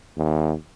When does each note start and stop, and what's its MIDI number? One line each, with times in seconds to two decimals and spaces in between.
0.17 0.53 39